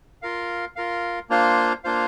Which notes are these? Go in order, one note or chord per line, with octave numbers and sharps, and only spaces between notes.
F4 A#4 F5
F4 A#4 F5
A#3 D4 F4 C5 F5
A#3 D4 F4 C5 F5